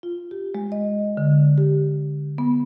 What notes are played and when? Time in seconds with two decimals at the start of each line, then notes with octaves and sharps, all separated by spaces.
0.03 F4
0.31 G4
0.55 G#3
0.72 D#5
1.17 D3
1.58 G4
2.38 B3